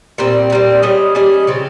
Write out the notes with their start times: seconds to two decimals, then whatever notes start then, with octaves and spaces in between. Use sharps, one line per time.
0.18 A#2 G3 C4
0.50 A#2 G3 C4
0.82 G3 C#4 G#4 D#5
1.15 G3 C#4 G#4 D#5
1.47 C#3 F3 C4 F4